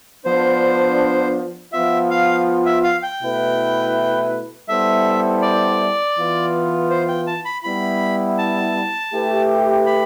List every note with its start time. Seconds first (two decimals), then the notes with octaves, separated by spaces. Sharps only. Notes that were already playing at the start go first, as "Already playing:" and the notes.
0.25 F3 B3 D4 C5
1.73 F3 B3 F4 E5
2.10 F5
2.66 E5
2.83 F5
3.03 G5
3.21 B2 A3 E4 B4
4.68 G3 B3 E4 A4 C5 E5
5.42 D5
6.16 E3 B3 F4
6.90 C5
7.08 G5
7.27 A5
7.45 B5
7.64 G3 B3 E4 B5
8.38 A5
9.11 A3 E4 G4 B4
9.86 B5